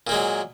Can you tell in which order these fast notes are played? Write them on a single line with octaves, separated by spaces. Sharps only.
A#2 A#3 G#3 F#3